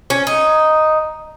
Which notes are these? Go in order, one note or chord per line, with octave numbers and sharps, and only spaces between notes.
C#4
D#4